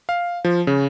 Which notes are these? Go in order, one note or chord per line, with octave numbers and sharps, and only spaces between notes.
F5
F3
C#3